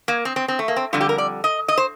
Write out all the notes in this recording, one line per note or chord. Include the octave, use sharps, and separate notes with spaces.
A#3
C4
C4
C4
A3
A#3
C4
F2 D3 G3 F4
G4
A#4
D5
D#5
D#5
C5